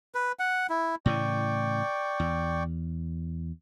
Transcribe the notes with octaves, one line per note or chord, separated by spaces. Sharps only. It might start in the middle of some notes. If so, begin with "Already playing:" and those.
B4
F#5
E4
A2 C#3 E3 D5 G5 C#6
E2